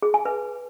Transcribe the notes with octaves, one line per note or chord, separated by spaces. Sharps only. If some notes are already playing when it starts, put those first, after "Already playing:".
G#4
G#5
B4